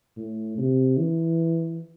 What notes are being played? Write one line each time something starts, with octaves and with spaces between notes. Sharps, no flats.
A2
C3
E3